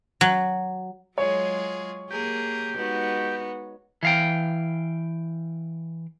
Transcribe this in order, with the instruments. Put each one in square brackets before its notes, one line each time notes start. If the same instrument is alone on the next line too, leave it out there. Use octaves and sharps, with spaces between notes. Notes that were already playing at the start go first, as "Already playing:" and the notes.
[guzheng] F#3
[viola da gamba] F#3 G#3 [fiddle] F4 G#4 [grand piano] C#5
[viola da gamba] A#3 G#4 [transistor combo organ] G4 [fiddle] A#4
[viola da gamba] G#3 D#4 F#4 [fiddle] B3
[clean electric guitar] E3 F5 G5